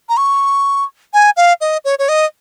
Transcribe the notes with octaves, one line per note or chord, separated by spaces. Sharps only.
A#5
C#6
G#5
F5
D#5
C#5
C#5
D#5